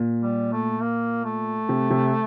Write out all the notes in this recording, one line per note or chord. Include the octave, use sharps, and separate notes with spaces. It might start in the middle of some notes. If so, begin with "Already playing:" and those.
Already playing: A#2
G3
A3
A#3
A3
C3
C3